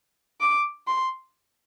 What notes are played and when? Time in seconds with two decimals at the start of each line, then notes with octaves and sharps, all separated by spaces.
0.41 D6
0.87 C6